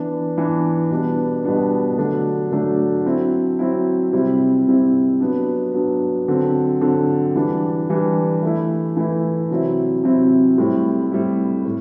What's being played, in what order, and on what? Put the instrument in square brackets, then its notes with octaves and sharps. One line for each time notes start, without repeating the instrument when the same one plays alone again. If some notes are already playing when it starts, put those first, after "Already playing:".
Already playing: [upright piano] E3 B3 D4
E3 B3 D4
B2 G3 B3 D4
B2 G3 B3 D4
D3 F#3 A3 D4
D3 F#3 A3 D4
F#3 C4 E4
F#3 C4 E4
C3 G3 C4 E4
C3 G3 C4 E4
F#3 B3 D4
F#3 B3 D4
D3 F#3 C4
D3 F#3 C4
E3 G3 D4
E3 G3 D4
E3 A3 E4
E3 A3 E4
C3 F#3 C4 E4
C3 F#3 C4 E4
A2 G3 C4 E4
A2 G3 C4 E4
A2